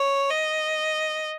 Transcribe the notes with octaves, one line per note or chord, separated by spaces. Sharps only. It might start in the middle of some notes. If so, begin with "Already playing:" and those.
Already playing: C#5
D#5